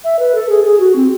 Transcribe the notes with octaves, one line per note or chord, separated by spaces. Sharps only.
E5
B4
A4
G#4
G#4
F#4
C4